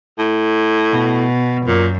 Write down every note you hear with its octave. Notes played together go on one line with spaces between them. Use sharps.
A2
B2
F#2 A#2